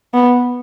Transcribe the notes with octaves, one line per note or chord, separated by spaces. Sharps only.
B3